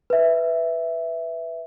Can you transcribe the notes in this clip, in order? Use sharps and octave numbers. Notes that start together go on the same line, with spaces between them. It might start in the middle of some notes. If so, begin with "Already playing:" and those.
B4 E5